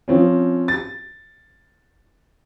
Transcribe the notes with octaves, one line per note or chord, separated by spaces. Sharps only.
F3 C4 C#4
A6